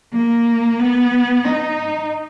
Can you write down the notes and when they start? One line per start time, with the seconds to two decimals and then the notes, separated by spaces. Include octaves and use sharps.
0.13 A#3
0.79 B3
1.44 D#4